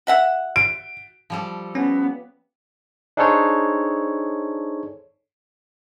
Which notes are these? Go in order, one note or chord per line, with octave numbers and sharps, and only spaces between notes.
F#4 E5 F#5
D7
F3 G3 A4
B3 C#4
D4 D#4 G#4 A4 C5 C#5